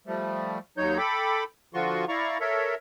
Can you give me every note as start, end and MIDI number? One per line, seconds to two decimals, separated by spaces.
0.07 0.58 53
0.07 0.58 55
0.07 0.58 57
0.77 0.98 39
0.77 0.98 54
0.77 0.98 63
0.77 0.98 73
0.77 0.98 91
0.98 1.44 69
0.98 1.44 79
0.98 1.44 83
0.98 1.44 86
1.74 2.05 50
1.74 2.05 53
1.74 2.05 65
1.74 2.05 66
1.74 2.05 84
1.74 2.05 85
2.08 2.38 64
2.08 2.38 74
2.08 2.38 77
2.08 2.38 82
2.08 2.38 85
2.40 2.75 69
2.40 2.75 70
2.40 2.75 73
2.40 2.75 76